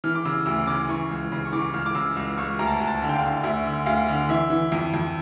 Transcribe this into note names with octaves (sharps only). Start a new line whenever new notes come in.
E3 F6
D6
C#3 E6
D2 E6
C#3 D6
E3 C#6
C#2
C#3
C#6
E3 D6
C#6
C#2 F6
D6
C#3 E6
C#2 E6
C#2 C#6
D2 A#5
A5
A#5
D2
A5
D3
G5
F5
D3
D2 E5
D3
D2 F5
D3
E3 E5
E3
F2
F2